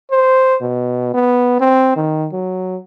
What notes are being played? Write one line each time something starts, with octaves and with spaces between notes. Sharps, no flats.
C5
B2
B3
C4
D#3
F#3